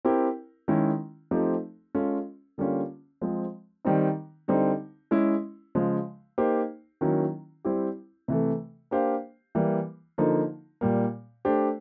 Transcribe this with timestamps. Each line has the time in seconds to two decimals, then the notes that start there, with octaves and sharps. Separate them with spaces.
0.05 C4 E4 G4 A#4
0.68 D#3 G#3 C#4 E4
1.31 F3 A3 C4 D#4 G4
1.95 G#3 C#4 F4 A4
2.58 D3 G3 A#3 C#4 F4
3.21 F3 G#3 C4
3.85 D#3 G3 C4 D#4
4.48 D3 G3 C4 D#4
5.11 G#3 C#4 E4
5.75 C#3 F3 G#3
6.38 A#3 D#4 G4 C5
7.01 D#3 F#3 A#3 C#4 E4
7.65 G3 C4 E4 G4
8.28 C3 E3 A3
8.91 A#3 D4 G4 C5 F5
9.55 E3 G3 A#3
10.18 D3 F3 A#3 D#4
10.81 A#2 G3 A#3
11.45 A3 D4 G4 C5